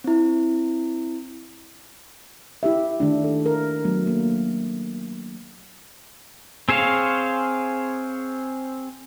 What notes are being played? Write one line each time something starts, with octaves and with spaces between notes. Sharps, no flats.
C4 E4
E4 G4 E5
D#3 A3 D4
A4
A#4
F#3 A3 B3
A#3
C4 G#4 C5 C#5 F5